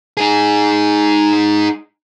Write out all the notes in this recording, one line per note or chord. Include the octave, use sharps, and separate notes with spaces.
D#4 G#4